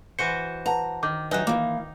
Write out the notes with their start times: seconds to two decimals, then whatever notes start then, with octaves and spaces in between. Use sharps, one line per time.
0.19 E3 F#4 C5 C#7
0.66 B4 F#5 A5 A#5
1.03 D#3 D6 G6
1.31 F#3 D#4 B4 E5 G#5 F#6
1.47 E3 A#3 D6